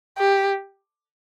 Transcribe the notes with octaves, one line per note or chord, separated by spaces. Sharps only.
G4